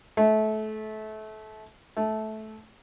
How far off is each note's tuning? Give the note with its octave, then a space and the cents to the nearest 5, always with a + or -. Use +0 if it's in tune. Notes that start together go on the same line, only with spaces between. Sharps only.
A3 -25
A3 -15